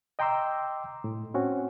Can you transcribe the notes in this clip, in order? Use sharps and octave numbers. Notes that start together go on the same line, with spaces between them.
D#5 G5 A#5 C6 D6 E6
A2
C4 C#4 F#4